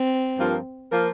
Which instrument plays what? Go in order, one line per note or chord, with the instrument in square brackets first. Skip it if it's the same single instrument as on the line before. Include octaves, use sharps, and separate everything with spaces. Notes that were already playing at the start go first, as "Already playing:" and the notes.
Already playing: [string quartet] C4
[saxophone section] G2 F3 A#3 F4 A#4
F3 A#3 F4 A#4